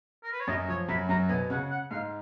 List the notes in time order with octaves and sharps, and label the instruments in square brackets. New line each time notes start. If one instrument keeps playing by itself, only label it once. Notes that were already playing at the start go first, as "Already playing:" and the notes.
[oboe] A#4
B4
C#5
[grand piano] F#2 F#3 [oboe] D#5
[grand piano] F3 [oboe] C#5
[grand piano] F#2 F#3 [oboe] B5
[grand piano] F#2 F#3 [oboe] A#5
[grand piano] B2 B3 [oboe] G#5
[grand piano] C#3 C#4 [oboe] F#5
[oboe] F#5
[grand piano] G#2 G#3 [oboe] F5